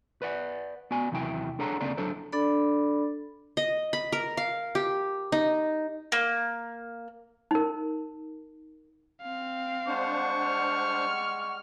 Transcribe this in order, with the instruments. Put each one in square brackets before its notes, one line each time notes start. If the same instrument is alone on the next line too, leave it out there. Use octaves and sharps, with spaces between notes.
[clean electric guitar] B4 D5 F#5
B3 F#4 D5 G#5
D#2 C3 E3 F#3 E4 G5
D4 G#4 A4 C#5 F#5 A#5
D2 C#3 A#3 C4 D5 A#5
D3 F#3 D4 A4 C5
[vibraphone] D4 A4 D5 B5
[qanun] D#5
B5
A#4
F5
G4
D#4
[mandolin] A#3
[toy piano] D#4 A#4
[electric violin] C4 F5
[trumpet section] G3 G#3 C#6 [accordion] D4 C5 [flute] F#5
[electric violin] F6